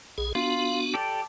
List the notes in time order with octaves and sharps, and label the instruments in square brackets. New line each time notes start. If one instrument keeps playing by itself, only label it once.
[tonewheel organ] B1 G#4
[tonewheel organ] B3 D4 F#4 [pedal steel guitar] F4
[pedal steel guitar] G4 A4 D5